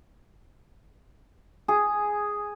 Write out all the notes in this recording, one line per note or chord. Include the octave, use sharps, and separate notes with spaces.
G#4